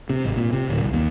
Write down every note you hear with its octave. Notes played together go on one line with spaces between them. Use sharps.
C3
G#1
A#2
C3
D1
C2
D#2